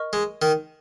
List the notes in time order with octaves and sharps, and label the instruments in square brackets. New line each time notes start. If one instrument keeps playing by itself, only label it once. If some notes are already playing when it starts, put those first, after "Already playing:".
Already playing: [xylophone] A#4 D#5 C#6 F6
[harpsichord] G#3
D#3